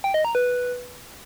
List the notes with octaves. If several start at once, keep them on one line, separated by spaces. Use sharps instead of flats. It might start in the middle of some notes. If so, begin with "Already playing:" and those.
G5
D#5
A#5
B4